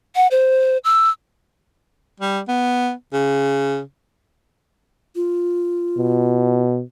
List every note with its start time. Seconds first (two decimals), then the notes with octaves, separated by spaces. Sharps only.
0.16 F#5
0.31 C5
0.84 E6
2.20 G3
2.48 B3
3.13 C#3
5.15 F4
5.98 B2